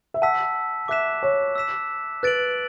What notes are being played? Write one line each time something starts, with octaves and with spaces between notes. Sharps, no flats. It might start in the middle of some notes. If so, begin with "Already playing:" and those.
E5
F#5 A5 E6 B6
E5 D6 F#6 B6 E7
C#5
E6 B6 E7
B4 F#6 A6 D7 F#7